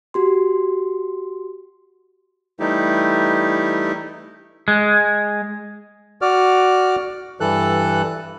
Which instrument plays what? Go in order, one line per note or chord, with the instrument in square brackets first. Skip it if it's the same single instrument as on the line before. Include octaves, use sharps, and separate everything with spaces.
[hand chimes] F#4 G4 C6
[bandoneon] E3 G3 A3 D#4 E4 G4
[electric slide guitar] G#3
[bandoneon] F#4 D5 F6
G2 E3 A4 F#6